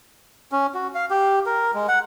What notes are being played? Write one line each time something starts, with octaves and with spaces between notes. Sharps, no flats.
C#4
F#4
F5
G4
A#4
G#3
F#5